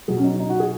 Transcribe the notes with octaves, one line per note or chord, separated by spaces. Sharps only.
B2 F#3 G#4
C#4
D#4
D#4
F#4
G#4